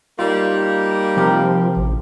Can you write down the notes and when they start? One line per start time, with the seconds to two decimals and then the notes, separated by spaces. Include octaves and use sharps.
0.19 G3 A#3 D#4 F4
1.17 C3 F3 G4 A#4
1.76 A1